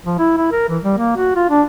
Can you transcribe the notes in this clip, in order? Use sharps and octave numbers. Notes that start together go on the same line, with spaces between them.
F3
E4
E4
A#4
E3
G3
A#3
F#4
F4
D4